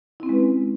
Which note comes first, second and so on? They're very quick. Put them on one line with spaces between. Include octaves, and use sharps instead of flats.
E4 C4 C#4 G#3 B4